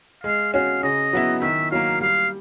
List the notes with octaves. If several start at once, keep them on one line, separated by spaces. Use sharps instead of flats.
G#3 F5
C#4 F#4 F5
C#3 D#5
F#3 B3 E4
D#3 E5
F#3 A#3 F5
G3 F5